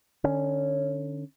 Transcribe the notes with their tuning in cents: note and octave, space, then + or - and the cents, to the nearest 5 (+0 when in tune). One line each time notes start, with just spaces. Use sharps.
D3 +25 C#4 +0